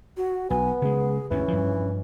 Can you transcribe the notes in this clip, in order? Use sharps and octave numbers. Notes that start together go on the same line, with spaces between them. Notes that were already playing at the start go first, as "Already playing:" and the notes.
F#4
B1 B3 G#5
C#3 G#3 G#4
D2 G2 E3 C#4
G2 F3